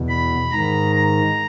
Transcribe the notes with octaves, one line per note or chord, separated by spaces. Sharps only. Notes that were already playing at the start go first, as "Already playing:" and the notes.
Already playing: E2 B2
B5
G#2 D#3 A#5
A#5